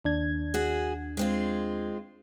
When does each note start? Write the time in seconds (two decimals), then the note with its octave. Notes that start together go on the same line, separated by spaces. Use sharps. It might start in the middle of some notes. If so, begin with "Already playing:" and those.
0.05 D#2 D4 G#6
0.54 F#4 G#4
1.17 G#3 C4 F4